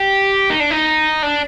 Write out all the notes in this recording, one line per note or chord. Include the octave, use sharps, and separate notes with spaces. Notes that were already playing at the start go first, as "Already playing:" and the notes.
Already playing: G4
D#4
D4
D#4
D4